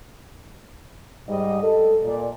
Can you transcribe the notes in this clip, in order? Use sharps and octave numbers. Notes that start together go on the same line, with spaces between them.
G#2 G3 D#5
A4
A#2 D5